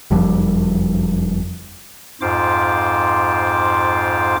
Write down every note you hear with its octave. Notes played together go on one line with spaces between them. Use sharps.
F#1 F2 F3 G3
F2 G#2 F4 C5 D6